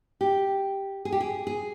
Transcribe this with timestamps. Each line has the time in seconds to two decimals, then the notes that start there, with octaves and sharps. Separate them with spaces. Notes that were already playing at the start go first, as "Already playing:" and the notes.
0.21 G4
1.05 G#4
1.12 G4
1.21 G#4
1.47 G#4